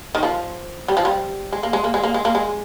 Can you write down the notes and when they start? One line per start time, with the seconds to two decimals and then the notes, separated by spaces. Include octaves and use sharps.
0.15 D#3
0.23 F3
0.88 G3
0.97 F3
1.05 G3
1.52 G#3
1.63 A#3
1.73 G#3
1.84 A#3
1.94 G#3
2.04 A#3
2.14 G#3
2.25 A#3
2.35 G#3